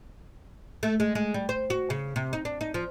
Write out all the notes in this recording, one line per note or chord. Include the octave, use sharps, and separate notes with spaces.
A3
G#3
G#3
G3
C5
F#4
C#3
C3
D#4
D4
D#4
F3